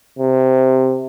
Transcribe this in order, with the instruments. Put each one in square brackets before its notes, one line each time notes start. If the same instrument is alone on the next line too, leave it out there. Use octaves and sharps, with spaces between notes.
[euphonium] C3